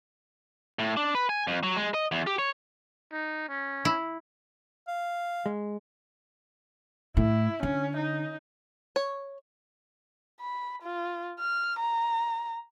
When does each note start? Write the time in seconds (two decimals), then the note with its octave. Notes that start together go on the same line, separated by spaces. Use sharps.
0.79 A2
0.97 D4
1.15 B4
1.29 G#5
1.47 F2
1.63 F#3
1.76 G#3
1.94 D#5
2.12 E2
2.27 G4
2.39 C#5
3.12 D#4
3.48 C#4
3.85 E4
4.88 F5
5.46 G#3
7.17 A2 E4
7.63 D3 C#4
7.97 D#4
8.96 C#5
10.41 B5
10.82 F4
11.40 F6
11.80 A#5